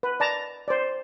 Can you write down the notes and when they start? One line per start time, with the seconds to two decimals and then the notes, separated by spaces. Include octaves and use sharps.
0.03 B4
0.20 D5 A5 A#5
0.68 C5 D5